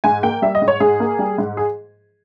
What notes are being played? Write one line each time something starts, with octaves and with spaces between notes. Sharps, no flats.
G#2 G#5
A#3 G5
G3 E5
D#5
G#2
C#5
G#2 G#4
A#3
G3
G#2
G#4